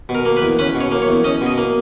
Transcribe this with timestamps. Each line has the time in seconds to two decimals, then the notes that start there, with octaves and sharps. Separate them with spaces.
0.09 B2
0.15 A#4
0.25 A#3
0.37 B4
0.42 E2
0.59 C#4 B4
0.75 B2
0.81 C#5
0.92 A#3
1.02 C#5
1.08 E2
1.24 C#4 D#5
1.41 B2 D#5
1.57 A#3